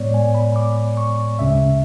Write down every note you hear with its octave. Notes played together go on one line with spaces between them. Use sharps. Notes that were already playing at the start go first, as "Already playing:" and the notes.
Already playing: A2 G#3 B3 C#5 D5
G#5
B5
D6
C#6
D2 C#3 G#3 C#4 E5